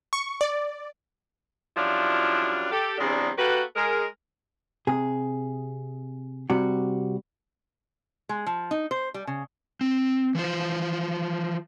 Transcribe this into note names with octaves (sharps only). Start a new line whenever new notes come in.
C#6
D5
F#2 F3 G3 D4 E4 F4
G4 A4
E2 C3 F#3 G#3 D4
A#3 F#4 G4 A4 B4
G#3 A#4
C3 G#4
C3 G3 F#4
G#3
F3
D#4
C5
G3
C#3
C4
E3 F3 F4 C5